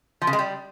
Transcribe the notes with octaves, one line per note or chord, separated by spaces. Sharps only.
F3
C#3
G#3
G3